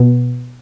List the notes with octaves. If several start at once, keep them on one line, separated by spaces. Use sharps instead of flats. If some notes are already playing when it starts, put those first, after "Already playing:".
Already playing: B2